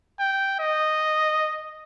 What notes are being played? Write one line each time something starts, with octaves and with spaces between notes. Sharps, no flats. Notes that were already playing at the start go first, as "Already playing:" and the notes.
G5
D#5